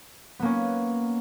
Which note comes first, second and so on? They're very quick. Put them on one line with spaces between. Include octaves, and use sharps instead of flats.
B3 A#3 C#4